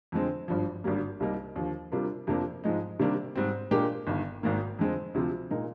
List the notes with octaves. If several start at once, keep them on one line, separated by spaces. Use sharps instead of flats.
F2 D3 G#3 C4
G#1 G2 F3
G#1 G2 D3 G3 A#3
C2 C3 G3 A#3 D#4
D#2 D3 F3
C3 G3 D4 F4 A#4
F2 C3 F3 A#3 D4
G#2 F3 G#3 D#4
C3 D#3 G3 A#3 D4
G#2 G3 C4
A#2 G#3 D4 G4 A#4
G1 G2 D#3
G#1 G#2 D#3 A#3
F2 D3 G#3 C4
D2 C3 F3 C4 F4
A#2 G#3 D#4 A#4